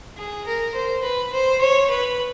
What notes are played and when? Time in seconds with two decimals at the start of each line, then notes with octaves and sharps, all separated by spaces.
0.17 G#4
0.46 A#4
0.75 C5
1.04 B4
1.33 C5
1.61 C#5
1.90 B4